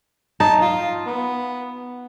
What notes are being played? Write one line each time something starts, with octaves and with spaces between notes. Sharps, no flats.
D#4 A5
F4
B3